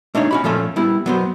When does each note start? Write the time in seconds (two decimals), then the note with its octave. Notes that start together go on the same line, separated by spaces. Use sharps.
0.15 A3 D4 D#4 C#5
0.31 C#4 F#4 B5
0.44 A#2 F3 A3 C#4
0.76 G3 B3 E4
1.06 F#3 B3 C5